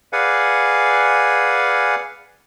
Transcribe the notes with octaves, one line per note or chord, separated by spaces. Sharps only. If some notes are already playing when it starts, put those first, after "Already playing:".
G#4 B4 D5 F5 F#5 G#5